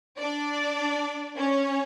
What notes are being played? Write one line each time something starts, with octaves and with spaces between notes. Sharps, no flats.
D4 D5
C#4 C#5